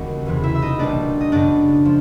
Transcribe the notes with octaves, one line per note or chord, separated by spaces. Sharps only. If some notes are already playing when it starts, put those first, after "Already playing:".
Already playing: D#2 C#3 E3 G3 F#4 F#5
E2 C3 E3
E4 E5
E5
D#4 D#5
B1 B2 G3 A#3 D4 D5
D#5
F#2 C#3 F#3 B3 D4 D5
F3